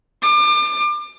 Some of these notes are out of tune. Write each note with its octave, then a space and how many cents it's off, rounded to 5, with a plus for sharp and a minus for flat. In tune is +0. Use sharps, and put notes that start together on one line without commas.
D6 +30